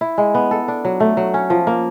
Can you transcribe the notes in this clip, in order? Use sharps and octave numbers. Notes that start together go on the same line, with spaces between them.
E4
G#3
B3
A4
D4
F#3
A3
F#3
C#4
F3
A#3